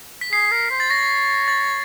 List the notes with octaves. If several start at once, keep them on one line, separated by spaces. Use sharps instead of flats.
B6
G#4 C7
A#4
C5
A6
C#5 A#6
A6